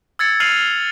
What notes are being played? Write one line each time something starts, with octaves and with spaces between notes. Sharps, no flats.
E6 G#6 A6 C#7
F6 C7 D#7 F7 F#7